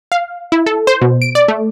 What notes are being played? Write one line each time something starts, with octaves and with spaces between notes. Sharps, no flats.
F5
E4
A4
C5
B2
D7
D5
A3